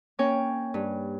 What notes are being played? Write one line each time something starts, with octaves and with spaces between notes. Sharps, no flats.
A#3 C#4 C#5 G5
G2